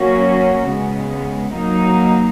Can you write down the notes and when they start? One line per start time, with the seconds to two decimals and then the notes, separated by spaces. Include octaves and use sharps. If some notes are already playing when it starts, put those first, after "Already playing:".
Already playing: F#3 A#3 C#4 F#4
0.67 C#3 G#3 B3
1.55 F#3 A#3 D#4